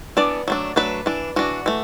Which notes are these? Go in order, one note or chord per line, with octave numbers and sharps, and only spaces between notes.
E3 B3 D4 D5
F#3 A3 D4
F#3 A3 D4 B4
E3 D4
E3 D4 F#4
E3 A3